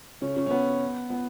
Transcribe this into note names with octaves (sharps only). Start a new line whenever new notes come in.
C#3 C#4
C#3 C#4
C#4
B3
B3